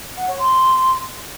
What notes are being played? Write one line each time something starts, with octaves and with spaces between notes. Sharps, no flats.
F#5
C#5
C6